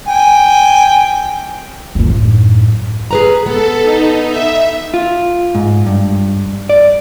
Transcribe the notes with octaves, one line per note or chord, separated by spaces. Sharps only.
G5 G#5
F#2 A2
G#4 B4 A#5
B3 A4
D#4
E5
F4
G#2
G2
D5